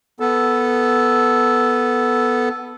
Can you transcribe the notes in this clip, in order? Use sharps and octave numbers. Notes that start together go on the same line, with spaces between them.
B3 A4